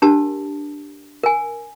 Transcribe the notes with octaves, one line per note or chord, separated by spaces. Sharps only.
D4 G4 A#4 A5
A#4 G#5